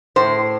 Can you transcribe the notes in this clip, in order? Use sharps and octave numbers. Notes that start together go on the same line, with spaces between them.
A2 C5